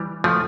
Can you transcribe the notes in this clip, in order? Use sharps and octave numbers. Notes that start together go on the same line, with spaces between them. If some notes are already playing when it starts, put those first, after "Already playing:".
Already playing: E3 G3
F3 A3